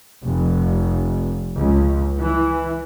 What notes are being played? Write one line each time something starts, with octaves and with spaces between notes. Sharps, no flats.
F1
C#2
E3